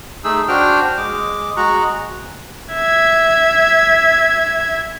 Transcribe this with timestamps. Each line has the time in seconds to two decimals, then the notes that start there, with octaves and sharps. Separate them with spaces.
0.24 A3 D#4 G#4 E6
0.48 D4 F#4 C5 G5 F6
0.97 G#3 D6
1.57 G#3 F#4 A#5 C#6 F#6
2.73 E5 G#6